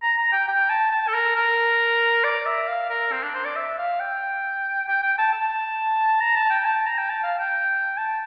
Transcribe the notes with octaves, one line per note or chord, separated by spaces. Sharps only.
A#5
A#5
G5
G5
A5
A5
A4
A#4
A#4
D5
E5
F5
A#4
C4
D4
C5
D5
E5
F5
G5
G5
G5
A5
A5
A#5
A5
G5
A5
A#5
G5
A5
F5
G5
A5